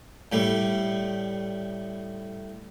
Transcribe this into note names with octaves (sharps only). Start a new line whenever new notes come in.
A2 G3 A3